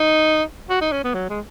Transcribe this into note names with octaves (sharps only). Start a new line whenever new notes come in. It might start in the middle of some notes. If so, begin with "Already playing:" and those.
Already playing: D#4
F#4
D#4
C#4
B3
F#3
G#3